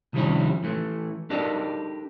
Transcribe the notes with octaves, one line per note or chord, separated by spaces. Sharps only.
C2 D#3 F3 G3 C#4 E4
E3 A3
D4 D#4 G4 A4 A#4 D5